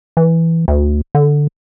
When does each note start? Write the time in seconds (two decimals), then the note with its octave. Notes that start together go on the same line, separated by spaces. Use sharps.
0.17 E3
0.68 D2
1.15 D3